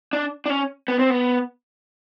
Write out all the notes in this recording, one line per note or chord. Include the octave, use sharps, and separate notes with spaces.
D4
D4
C#4
B3
C4
B3